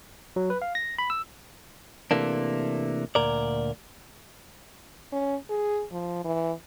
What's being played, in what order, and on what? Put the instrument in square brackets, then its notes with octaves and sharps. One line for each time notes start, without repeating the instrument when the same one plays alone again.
[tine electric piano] F#3
B4
F5
A#6
B5
E6
[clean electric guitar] C3 E3 A3 A#3 D4
D2 A#2 A#4 D5
[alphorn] C#4
G#4
F3
E3